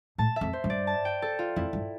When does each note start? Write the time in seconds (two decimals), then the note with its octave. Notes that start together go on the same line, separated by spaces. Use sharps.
0.18 A2 A5
0.36 E5
0.41 F2
0.53 C5
0.64 G2
0.70 D5
0.87 A5
1.05 G5
1.22 A4
1.39 F4
1.56 F2 E4
1.73 G2